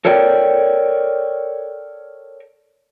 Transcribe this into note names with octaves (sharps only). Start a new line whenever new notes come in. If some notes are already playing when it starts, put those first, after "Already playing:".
A4 A#4 C#5 D5 G5